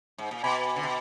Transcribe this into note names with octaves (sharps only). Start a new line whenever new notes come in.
G#2
A#2
B2 G#5 B5
D3
B2